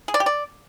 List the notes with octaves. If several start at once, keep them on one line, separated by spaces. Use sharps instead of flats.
G#4
D5
G4
D5